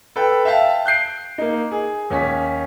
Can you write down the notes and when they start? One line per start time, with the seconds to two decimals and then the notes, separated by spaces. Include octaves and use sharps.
0.16 A4 B4 G5
0.45 E5 F5 G5 A5
0.85 F#6 G6 C7 D7
1.38 A#3 D#4
1.72 G#4
2.10 D#2 C#4 G#5 B6